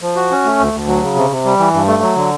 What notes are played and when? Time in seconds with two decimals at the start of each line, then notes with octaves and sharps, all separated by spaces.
0.01 F3
0.16 F#4
0.31 C#4
0.45 A3
0.59 D2
0.73 D2
0.87 F#3
1.02 C#3
1.16 C3
1.30 C3
1.45 G3
1.59 E3
1.73 G2
1.87 A3
2.02 F#3
2.16 D3